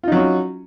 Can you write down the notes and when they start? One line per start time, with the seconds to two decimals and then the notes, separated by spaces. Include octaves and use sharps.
0.03 F4
0.08 D#4
0.12 F#3
0.16 C#4